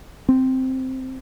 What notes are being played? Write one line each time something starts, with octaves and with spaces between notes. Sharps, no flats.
C4